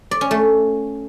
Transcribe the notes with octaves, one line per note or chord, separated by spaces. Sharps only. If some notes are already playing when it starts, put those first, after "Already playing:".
D5
C#4
A3